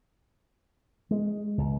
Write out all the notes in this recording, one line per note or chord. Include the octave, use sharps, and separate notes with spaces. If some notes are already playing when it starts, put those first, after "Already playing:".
G#3
C#2